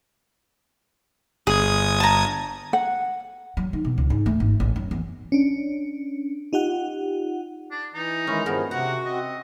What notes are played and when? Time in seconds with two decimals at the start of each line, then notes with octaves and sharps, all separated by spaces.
1.47 G1 G#4 D#6 G#6
2.00 A5 A#5
2.73 F#5
3.57 F#3
3.73 D#3
3.85 B2
3.98 C#2
4.10 G#2
4.26 A3
4.40 G#1
4.60 A1
4.76 F#2
4.91 E2
5.32 C#4 D4
6.53 D#4 F4 G4 F#5
7.71 D4
7.94 E3 D#4
8.27 D#3 E3 G#3 C#4 E4
8.46 G2 D#3 F3 B3 G#4 A#4
8.71 C3 F#4 F#5 A#5
9.05 C4 D#5